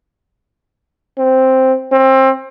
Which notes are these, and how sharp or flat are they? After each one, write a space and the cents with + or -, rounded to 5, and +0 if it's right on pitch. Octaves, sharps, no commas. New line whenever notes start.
C4 +0
C4 +25